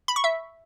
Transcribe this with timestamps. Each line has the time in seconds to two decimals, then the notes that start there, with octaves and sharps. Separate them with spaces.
0.08 B5
0.16 C#6
0.24 E5